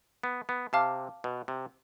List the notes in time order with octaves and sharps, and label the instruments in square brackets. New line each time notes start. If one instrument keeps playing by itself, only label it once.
[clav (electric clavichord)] B3
B3
[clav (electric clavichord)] C3 [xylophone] F5 A5 D6 F6
[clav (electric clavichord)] B2
C3